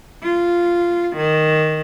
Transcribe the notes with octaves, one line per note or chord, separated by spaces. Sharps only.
F4
D#3